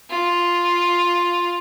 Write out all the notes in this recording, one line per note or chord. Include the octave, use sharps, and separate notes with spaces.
F4